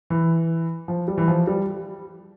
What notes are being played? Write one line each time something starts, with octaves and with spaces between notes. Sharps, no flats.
E3
F3
G3
E3
F3
G3